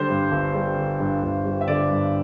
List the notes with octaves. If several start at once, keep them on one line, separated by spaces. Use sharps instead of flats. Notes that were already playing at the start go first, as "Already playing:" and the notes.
Already playing: D3 G3 C5
G2
G1
G3
D3
G2
G1
G3
E5
D3 D5
G2